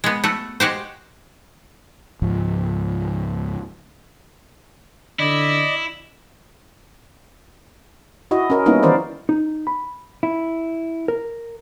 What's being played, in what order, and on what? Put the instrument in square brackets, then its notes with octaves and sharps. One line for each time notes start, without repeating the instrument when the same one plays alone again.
[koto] G#3 B3
A3 F#4
G#3 F#4 G4 C5
[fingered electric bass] C#2 G#2 F3
[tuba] D3 [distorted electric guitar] E4 [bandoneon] D5 D#5
[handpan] E4 F#4 D#5
C#4 A#4 D#5
G3 A#3 B3 C#4 D#4 E4
D#3 E3 C#4 A#4 C5 D5
[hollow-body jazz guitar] D#4
B5
E4
A#4